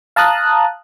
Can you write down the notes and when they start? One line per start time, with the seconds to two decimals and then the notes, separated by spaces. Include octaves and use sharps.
0.16 F5 A5 A#5 D#6 F#6